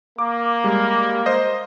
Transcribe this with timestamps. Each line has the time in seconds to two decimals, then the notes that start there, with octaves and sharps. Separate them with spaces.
0.18 A#3 D6
0.64 G3 G#3
1.26 C5 D#5